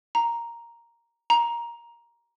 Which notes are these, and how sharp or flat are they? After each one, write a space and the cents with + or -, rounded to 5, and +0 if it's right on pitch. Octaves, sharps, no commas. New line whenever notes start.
A#5 +0
A#5 +10